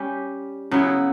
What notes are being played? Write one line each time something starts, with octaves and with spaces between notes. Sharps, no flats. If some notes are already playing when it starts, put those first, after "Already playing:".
Already playing: G3 C#4 G4
C#3 F#3 B3 E4